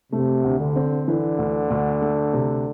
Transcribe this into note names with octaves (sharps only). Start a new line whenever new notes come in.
C3 A3
D2
D3
C4
D3 E3
D2
D2
A3
C3